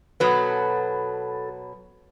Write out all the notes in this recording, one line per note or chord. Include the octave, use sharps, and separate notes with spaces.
B2 F#3 B3 A4 B4 D#6